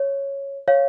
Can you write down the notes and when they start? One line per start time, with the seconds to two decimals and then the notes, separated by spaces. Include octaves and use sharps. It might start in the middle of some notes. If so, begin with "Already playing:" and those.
Already playing: C#5
0.68 C#5 F5